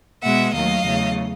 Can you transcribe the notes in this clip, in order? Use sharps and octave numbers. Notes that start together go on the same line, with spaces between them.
B2 G#3 B3 E5 F#5
D#2 D#3 F#3 A3 D#5 F5
E2 C#3 F#3 A3